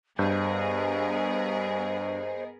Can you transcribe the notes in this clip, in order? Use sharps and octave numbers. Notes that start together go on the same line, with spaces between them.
G2 B3 G#4 A#4 C5 D#5